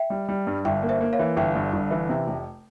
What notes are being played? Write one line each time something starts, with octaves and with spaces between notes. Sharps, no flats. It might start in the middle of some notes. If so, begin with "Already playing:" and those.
Already playing: E5 G5
G3
G3
G2
G1 E5 G5
A#3
C5 E5
A#3
C#5 F5
E3
G1 E5 G5
G2
G1
E3
C3
F1